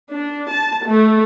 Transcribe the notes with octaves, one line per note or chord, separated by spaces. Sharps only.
D4
A5
A3